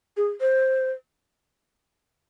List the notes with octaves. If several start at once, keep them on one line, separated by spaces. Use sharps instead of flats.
G#4
C5